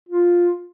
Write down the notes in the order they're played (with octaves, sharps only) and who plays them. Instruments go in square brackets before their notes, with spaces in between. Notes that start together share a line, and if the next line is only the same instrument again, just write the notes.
[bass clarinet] F4